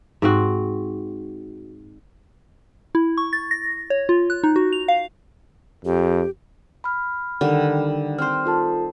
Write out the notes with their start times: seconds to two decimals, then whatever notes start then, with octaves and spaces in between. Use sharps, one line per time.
0.22 G#2 C4 F#4
2.95 E4
3.17 C#6
3.33 A6
3.51 A#6
3.90 C#5
4.09 F4
4.30 F#6
4.43 D#4
4.56 F#4
4.73 F7
4.88 F5
5.85 F2 G4
6.84 B5 F6
7.41 D3 D#3 G3
8.18 C4 C5 C6 F6
8.45 F4 A4 A5